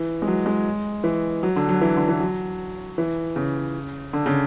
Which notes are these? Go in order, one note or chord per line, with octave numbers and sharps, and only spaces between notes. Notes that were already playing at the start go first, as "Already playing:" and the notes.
Already playing: E3
G#3
F#3
G#3
E3
F#3
D3
F#3
E3
D3
E3
F#3
E3
C#3
D3
C#3